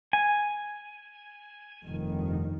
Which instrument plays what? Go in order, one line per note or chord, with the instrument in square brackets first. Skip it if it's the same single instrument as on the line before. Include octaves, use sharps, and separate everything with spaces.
[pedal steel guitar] G#5
[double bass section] F1 G2 D#3